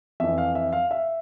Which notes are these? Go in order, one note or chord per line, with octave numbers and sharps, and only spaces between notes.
F2 E3 E5
F5
E5
F5
E5